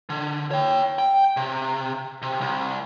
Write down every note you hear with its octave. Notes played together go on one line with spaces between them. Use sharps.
D3
C#5 G5
G5
C3
C3
C2